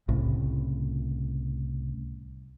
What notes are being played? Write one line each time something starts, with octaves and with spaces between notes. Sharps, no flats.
C2 A2 C#3